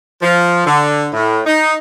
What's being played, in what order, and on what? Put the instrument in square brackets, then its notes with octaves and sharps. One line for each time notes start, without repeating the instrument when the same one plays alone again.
[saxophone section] F3
D3
A2
D#4